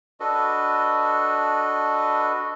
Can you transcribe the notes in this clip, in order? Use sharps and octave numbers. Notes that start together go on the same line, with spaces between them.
D4 F#4 A4 B4 D#5